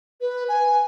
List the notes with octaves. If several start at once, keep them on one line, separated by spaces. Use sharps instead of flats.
B4
G#5